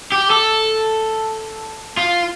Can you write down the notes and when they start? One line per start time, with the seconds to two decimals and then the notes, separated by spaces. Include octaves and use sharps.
0.12 G4
0.30 A4
1.97 F4